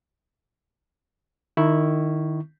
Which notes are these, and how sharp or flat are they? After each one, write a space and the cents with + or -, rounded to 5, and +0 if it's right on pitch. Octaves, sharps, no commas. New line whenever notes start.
D#3 -20 E4 -5 C#6 +0